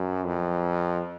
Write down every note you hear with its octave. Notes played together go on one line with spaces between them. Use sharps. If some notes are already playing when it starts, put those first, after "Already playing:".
Already playing: F#2
F2